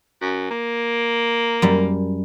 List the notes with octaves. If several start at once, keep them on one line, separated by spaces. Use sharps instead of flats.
F#2
A#3
F#2 G3